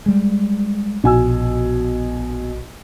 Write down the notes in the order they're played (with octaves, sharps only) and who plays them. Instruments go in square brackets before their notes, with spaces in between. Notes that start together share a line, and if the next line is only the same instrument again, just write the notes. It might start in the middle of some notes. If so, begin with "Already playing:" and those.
[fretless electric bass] G3 G#3
[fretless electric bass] A#1 [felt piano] B2 G#5 E6